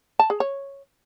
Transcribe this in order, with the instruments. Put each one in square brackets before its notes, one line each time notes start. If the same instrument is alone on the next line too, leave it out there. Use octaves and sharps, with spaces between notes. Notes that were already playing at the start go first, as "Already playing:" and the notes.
[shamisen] A5
G#4
C#5